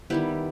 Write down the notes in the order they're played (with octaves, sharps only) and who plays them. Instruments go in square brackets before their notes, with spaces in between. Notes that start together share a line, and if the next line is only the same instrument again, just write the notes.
[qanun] D#3 G3 B3 E4 G4